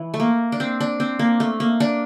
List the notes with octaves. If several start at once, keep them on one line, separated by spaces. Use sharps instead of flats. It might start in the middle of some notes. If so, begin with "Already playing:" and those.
Already playing: E3
A3
A#3
D4
C4
D4
C4
A#3
A3
A#3
D4